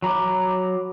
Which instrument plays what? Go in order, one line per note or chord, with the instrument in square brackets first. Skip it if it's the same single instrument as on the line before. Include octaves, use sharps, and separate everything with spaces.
[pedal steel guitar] F#3 A#5 B5 D6